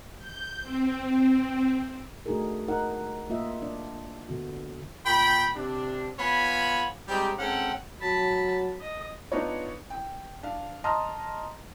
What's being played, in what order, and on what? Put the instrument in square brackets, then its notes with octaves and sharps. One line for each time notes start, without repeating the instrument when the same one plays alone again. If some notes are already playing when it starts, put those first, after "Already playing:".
[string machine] G6
C4
[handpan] A3 D4 D#4 F#4 G#4 A#4
D#4 A#4 F#5
A#3 F4 D#5 E5
D4 D5
D3 B3 F#4
[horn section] A#2 G5 B5
C3 D4
B3 F4 C#5 G#5 B5
G3 G#3 C4 D#4 G4
G#2 C4 C#4 A4 F#5 G5
[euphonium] F#3 [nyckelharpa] A5 B5
[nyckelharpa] D#5
[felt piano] B3 D4 D#4 F4 C#5
G5
D4 F5
D#5 A5 A#5 C6 D#6 F6